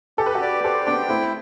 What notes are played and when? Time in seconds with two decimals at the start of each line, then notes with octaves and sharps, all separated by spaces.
0.18 G4 A4
0.26 B4
0.35 F#4 A4
0.41 D5
0.64 G4 A4 C5
0.86 B3 D4 G5
1.09 A3 C4 E4